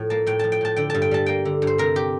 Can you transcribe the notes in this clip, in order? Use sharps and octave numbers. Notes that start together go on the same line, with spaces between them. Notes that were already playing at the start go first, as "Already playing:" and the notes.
Already playing: A2 F3
A#3 A5
A2 G5
F3 A5
G5
A2 A5
D3 G5
G2 A5
G5
G3 A5
A#3 G5
D3
G2
C5
C3 A#4
G4